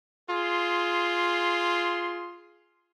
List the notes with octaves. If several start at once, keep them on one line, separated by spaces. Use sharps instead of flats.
F4 G#4 C6